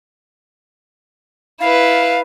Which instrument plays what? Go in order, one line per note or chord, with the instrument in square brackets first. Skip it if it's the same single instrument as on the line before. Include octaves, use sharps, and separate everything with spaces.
[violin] E4 B4 [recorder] F5